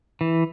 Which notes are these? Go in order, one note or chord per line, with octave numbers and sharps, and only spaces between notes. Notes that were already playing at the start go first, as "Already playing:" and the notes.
E3